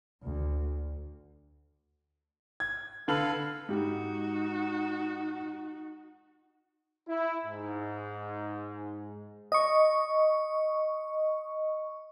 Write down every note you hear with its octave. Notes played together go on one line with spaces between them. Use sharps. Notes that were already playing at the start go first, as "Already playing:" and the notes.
D2
G#6
D3 A4 B4 F5 F#7
G#2 D#4 F#4 G4
E4
G#2
D#5 C#6